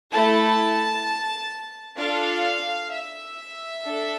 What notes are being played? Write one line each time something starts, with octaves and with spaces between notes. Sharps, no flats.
A3 E4 A4 A5
D4 F4 A4 F5
E5
D4 A4